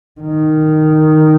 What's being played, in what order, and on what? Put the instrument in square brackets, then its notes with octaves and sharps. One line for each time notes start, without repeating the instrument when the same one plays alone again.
[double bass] D#3